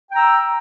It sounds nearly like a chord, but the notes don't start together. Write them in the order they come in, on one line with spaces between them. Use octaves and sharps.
G5 A#5 E6